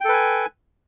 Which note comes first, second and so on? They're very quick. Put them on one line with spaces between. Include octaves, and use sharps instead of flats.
G5 A4 B4 G#5